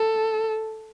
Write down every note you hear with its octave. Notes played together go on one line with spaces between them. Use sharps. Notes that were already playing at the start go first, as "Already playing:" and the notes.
Already playing: A4